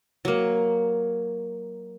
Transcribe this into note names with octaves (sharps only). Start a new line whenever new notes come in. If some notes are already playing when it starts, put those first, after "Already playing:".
F#3 A#3